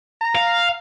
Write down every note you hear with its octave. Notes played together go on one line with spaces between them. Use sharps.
A#5
F5